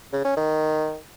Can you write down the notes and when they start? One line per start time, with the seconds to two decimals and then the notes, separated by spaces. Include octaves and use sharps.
0.13 C#3
0.25 C#4
0.37 D#3